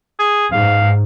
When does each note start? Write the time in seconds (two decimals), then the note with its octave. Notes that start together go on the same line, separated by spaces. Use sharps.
0.19 G#4
0.52 G#2 F5